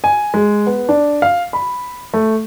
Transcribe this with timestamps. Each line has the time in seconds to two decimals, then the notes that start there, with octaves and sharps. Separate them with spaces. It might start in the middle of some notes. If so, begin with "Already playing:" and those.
0.04 G#5
0.34 G#3
0.66 B3
0.89 D4
1.22 F5
1.53 B5
2.14 A3